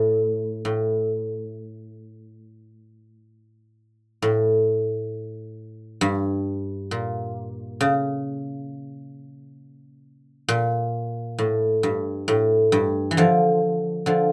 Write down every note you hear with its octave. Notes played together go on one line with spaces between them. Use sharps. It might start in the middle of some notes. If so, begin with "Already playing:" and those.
Already playing: A2
A2
A2
G2
A#2
C#3
A#2
A2
G2
A2
G2
E3
D3 F3
D3 F3